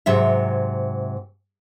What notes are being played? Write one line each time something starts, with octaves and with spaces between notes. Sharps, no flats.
G#2 C3 F#3 E5